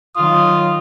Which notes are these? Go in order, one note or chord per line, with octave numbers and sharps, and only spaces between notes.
D#3 F#3 F4 D#6